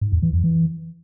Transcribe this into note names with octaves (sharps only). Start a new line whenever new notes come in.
G#2
E2
E3
F2
E3